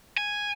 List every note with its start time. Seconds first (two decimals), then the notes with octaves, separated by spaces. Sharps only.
0.17 G#5